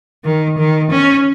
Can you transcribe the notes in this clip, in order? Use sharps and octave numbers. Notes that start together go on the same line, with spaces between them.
D#3
D#3
C#4